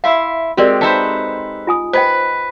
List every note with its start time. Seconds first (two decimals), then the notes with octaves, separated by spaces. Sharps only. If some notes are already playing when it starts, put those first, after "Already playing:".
0.04 E4 E5 F5 C6
0.57 G#3 C4 F#4 G4 A#4 D5
0.81 D#4 A4 B4 C5 E5
1.67 F4 G#5 D#6
1.93 B4 C5 D#5 G5